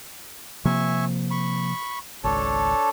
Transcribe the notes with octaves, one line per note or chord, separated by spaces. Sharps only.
C3 F3 A#3 E5 G#5 C#6
B5 C#6
G#1 C#2 D4 A4 C#5